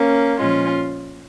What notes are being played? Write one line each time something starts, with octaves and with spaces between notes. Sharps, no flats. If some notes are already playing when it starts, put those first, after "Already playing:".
Already playing: A#3 C#4
A#2 F3 G#3 C#4 F4